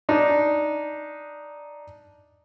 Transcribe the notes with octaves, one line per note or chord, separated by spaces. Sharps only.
D4 D#4